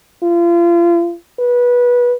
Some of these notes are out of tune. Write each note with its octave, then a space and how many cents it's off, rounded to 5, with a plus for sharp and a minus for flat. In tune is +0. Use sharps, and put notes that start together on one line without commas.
F4 -35
B4 -20